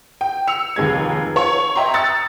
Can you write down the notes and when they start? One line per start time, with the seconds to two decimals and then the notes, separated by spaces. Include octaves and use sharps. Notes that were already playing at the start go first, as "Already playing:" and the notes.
0.21 G5
0.47 E6 C#7 F7
0.76 F1 D#2 G#3 G#6
1.36 C#5
1.75 D#5 E5 G5 A#5 C6
1.94 D#6 E6 F#6 A6 C#7